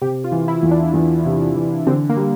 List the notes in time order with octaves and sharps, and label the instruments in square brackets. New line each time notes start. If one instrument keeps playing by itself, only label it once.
[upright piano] C3 [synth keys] G4
[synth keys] F4
[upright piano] E3
[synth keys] E4
[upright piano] E2
[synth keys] D4
[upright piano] E2
C3
E3
[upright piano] D3 [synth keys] C4
[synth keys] A#3
[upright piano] G3